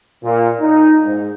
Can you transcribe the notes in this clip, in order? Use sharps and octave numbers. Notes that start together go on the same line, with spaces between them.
A#2
D#4
G#2